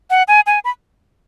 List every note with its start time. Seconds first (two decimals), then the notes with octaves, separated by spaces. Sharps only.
0.10 F#5
0.28 G#5
0.47 G#5
0.64 B5